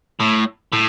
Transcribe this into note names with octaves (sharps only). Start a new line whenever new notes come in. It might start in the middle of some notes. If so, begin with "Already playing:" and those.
A2
A2